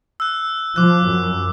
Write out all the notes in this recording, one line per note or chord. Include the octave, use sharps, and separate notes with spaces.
E6 F#6
F3 D6 F#6
F#2